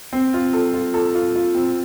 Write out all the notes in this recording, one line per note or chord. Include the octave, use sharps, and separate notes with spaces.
C4
F4
A4
F4
A4
F4
F4
C4